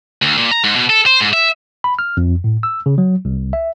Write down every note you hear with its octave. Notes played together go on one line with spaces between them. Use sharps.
D2
A#2
A#5
G#2
B2
A4
C5
G#2
E5
B5
F6
F2
A2
E6
C#3
F#3
C2
E5